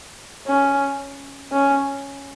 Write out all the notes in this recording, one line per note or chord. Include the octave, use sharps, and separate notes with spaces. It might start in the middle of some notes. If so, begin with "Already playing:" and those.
C#4
C#4